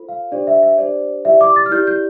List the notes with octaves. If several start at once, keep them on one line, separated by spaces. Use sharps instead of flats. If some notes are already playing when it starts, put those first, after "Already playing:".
Already playing: F4 A4 C5
F5
D4 G4 C5 D5
E5
E5
D4 G4 C5 D5
E4 G4 D5 E5
D6
A6
F6
E4 G4 D5 G6
G6